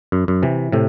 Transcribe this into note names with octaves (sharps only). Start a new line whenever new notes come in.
F#2
F#2
C3 E3
A2 C3